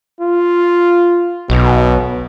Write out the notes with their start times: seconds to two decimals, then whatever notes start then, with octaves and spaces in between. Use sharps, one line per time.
0.21 F4
1.50 B1 B2